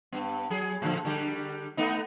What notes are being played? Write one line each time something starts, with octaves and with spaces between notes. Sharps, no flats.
G2 B3
F#3 G#4
A2 D3 F3
D3 G3 G4
A3 B3 D#4